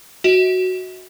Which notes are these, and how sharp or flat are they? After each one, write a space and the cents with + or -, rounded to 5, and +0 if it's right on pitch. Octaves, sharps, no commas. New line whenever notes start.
F#4 +0 E5 -45